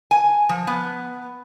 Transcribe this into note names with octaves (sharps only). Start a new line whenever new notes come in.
G#5
F3
B3